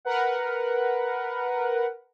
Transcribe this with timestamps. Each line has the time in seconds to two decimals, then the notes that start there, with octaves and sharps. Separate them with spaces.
0.05 A#4 B4 F#5